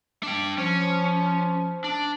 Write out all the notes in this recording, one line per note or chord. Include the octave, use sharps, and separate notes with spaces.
D4 G5
F3 C#4
D4